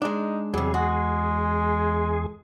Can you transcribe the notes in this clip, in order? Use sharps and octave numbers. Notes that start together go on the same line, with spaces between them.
G#3 D4 D#4
E2 C3 F#3 G3 G#4
G#3 F#4